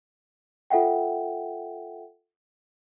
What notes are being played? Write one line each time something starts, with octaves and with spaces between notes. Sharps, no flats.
F4 A4 E5 F#5 G5